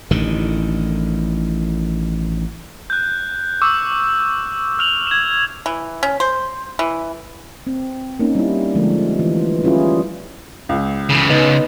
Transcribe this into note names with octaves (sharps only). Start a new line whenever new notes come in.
A1 A2 D3 D#3
F#6 G6
C#6 D6 E6
F6 F7 F#7
G#6 E7
E3
C#4
C5
E3
C4
A#3 C4 C#4 D#4
G3 E4
D3 F3 G#3 A3 A#4
E3 F4
G3 C#4 E4 F4 G#4
C#2
C#3 E3
C#2 B3 D#4